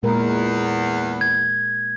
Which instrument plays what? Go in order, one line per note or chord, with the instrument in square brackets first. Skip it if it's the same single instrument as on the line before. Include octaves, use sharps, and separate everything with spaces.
[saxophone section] E2 [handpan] A#2 G#3 A#4
[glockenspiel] G#6